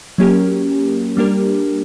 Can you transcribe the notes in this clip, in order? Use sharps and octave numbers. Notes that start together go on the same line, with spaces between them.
F#3 A#3 C#4 G4 A#4
G3 A#3 D4 G4 A#4